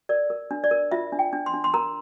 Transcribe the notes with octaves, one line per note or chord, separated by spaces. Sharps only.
A#4 D5
A#4
D4
D5
A#4
F4 E5
D4
G5
D4
C6
D4
C6
A#4 A#5